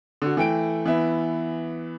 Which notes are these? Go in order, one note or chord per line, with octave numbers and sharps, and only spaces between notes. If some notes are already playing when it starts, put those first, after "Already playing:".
D3 F#4
E3 A3 G5 D7
E3 B3 E5